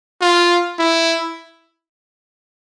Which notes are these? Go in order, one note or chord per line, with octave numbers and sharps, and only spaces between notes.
F4
E4